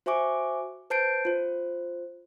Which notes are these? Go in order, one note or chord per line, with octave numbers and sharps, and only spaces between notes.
F#4 C5 E5 G#5 C#6 D6
B4 C5 A5 G6 C7 D7
F4 C5